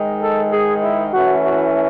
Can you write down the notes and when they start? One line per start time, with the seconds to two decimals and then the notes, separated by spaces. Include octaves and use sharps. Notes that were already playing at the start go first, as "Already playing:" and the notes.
Already playing: G#2 D#3 G#3
0.21 A4
0.51 G#4
0.83 E4
1.13 E3 A3 C#4 E4 F#4
1.44 F#4